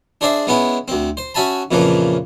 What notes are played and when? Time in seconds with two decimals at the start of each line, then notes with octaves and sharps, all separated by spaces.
0.21 D4 G#4 C5 D5 E5
0.47 G#3 B3 C#4 E4
0.88 D2 C4
1.17 C5
1.34 C#4 F#4 E5 G#5 A5 B5
1.71 F2 A#2 C#3 E3 F3